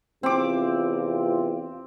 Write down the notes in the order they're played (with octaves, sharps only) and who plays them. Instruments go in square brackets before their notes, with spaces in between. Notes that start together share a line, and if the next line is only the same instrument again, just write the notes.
[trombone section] E2 C3 F4 [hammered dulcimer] C4 D6